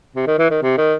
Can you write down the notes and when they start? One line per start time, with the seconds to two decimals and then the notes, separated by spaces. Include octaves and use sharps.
0.15 C3
0.27 D#3
0.39 E3
0.50 D#3
0.62 C3
0.78 D#3